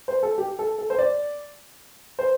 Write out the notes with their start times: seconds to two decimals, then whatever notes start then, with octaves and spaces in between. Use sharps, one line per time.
0.08 C5
0.23 A4
0.38 G4
0.59 A4
0.78 A4
0.90 C5
0.99 D5
2.19 C5